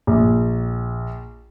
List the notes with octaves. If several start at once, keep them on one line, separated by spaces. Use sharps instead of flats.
A#1